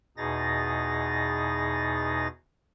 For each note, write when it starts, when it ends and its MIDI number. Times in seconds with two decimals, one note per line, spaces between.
0.17 2.27 40
0.17 2.27 47
0.17 2.27 63
0.17 2.27 68
0.17 2.27 93
0.17 2.27 94